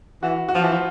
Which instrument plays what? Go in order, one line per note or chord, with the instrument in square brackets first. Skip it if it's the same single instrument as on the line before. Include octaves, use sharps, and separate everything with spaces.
[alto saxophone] E3 [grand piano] F#4
[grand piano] F#4
[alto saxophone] F3 [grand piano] F4
[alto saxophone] E3
[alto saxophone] F3 [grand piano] F4